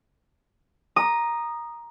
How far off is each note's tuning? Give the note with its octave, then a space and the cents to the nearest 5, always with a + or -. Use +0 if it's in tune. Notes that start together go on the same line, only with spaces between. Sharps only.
A#5 +10 D#6 -15